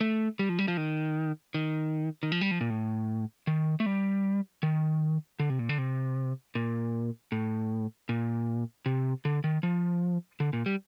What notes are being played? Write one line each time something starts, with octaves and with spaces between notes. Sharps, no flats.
A3
G3
F3
G3
F3
D#3
D#3
D#3
F3
G3
F3
A#2
A2
D#3
A3
G3
D#3
D3
C3
A#2
D3
C3
A#2
A2
A#2
C3
D3
D#3
F3
D3
A#2
G3